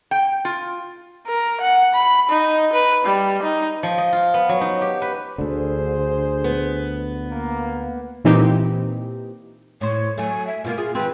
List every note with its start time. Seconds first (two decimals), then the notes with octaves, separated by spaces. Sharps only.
0.11 G5
0.45 F4
1.27 A#4
1.60 F#5
1.94 B5
2.29 D#4
2.73 B4
3.04 G3
3.43 D#4
3.83 F3
3.98 D#5
4.13 F4
4.34 B3
4.49 F#3
4.61 D#4
4.81 G4
5.02 B4
5.38 D2 D3 G#4 C5
6.44 B3
7.31 A#3
8.24 A#2 E3 C4 D#4 G4
9.81 A2 C5 C#5
10.18 F#3 A3 G#5
10.47 E5
10.64 B2 D3 A#3 F4
10.78 F4 G#4
10.95 E3 C4 B4